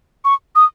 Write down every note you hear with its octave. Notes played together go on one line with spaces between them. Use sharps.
C#6
D#6